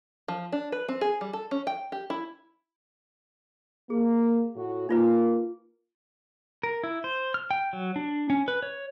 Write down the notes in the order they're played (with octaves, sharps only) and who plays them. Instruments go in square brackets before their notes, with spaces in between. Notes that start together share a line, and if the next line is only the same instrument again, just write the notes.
[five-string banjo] F3
D4
B4
C4
G#4
G3
A4
C#4
G5
G4
E4
[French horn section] A#3 [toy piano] G#4
[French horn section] A2 F#4
[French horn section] A#3 [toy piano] D#4 F4 B4
[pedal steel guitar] A#4
E4
C5
F6
G5
F#3
D4
C#4
B4
C#5